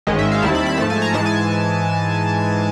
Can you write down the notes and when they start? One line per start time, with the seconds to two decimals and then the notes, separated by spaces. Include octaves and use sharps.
0.07 G#1 G#2 D#3 G#3 C#4 D#5
0.19 E5
0.32 F5
0.42 D#2 D#3 G3 C4 E4 A5
0.55 B5
0.67 B5
0.78 G#2 F3 A3 A5
0.90 G#5
1.02 A#5
1.13 G#2 E3 G#3 A5
1.26 G#5